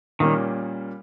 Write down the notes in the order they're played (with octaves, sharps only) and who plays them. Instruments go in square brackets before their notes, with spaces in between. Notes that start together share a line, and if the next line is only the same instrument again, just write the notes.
[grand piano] A#2 G3 A#3 C#4 [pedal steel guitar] D#3